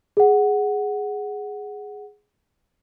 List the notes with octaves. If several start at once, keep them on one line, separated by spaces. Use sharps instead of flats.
G#4 F#5